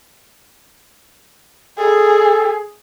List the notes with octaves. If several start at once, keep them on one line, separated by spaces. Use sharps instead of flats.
G#4 A4